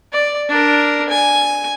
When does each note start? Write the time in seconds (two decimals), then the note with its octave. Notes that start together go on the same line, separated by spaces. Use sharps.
0.13 D5
0.49 D4 A#4
1.10 G#5